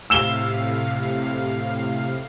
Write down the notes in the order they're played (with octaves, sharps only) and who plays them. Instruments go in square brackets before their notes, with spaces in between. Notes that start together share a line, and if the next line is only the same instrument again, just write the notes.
[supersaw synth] A2 C3 F5 [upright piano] E6 E7 G7